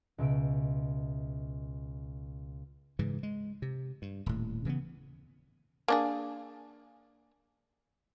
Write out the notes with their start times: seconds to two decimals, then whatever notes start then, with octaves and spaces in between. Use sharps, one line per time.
0.18 C#2 B2 E5 E6 D7
2.99 G#2 C#3 E3
3.23 G#3
3.62 C3
4.02 G2
4.26 D#1 A2
4.65 C#3 E3 A#3 B3
5.88 A#3 D4 G#4